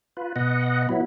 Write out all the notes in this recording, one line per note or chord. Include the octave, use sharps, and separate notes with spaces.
F4 B4
B2 D#5 F#5
F#3 B3 E4